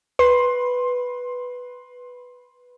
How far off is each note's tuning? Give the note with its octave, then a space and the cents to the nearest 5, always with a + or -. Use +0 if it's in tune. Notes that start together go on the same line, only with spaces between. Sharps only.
B4 +0 C6 +20